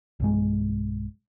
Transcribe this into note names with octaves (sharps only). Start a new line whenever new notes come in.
B1 G2 G#3